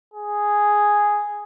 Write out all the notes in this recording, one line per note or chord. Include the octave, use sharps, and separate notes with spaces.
G#4